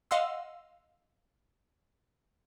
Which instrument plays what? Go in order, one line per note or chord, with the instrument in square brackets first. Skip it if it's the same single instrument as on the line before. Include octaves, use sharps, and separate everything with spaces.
[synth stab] D#5 F5 F#5 C6 E6